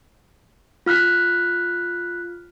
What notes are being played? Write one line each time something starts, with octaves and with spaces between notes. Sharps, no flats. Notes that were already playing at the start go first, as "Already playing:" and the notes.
F4 F6 F#6 B6